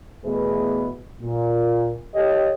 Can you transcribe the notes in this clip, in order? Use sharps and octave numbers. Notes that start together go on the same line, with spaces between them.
E2 B2 A3 E4 G#4 B4
A#2
G4 A4 C#5 D#5